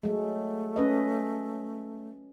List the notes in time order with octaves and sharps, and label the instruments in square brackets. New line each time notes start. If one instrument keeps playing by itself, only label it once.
[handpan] F#3 G#3 [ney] A3
[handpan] C#4 B4 D#5